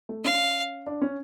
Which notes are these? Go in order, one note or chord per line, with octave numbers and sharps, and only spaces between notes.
A3
C#4 F5
D4
C#4